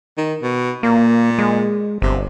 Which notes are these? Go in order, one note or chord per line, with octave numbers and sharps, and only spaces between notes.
D#3
B2
A#2 A#3
G#3
G1 C3